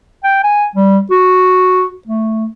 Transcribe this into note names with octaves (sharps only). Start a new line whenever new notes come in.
G5
G#5
G3
F#4
A3